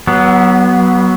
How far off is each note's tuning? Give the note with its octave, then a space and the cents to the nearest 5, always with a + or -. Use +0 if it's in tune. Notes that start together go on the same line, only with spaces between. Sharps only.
F#3 +20 B3 -15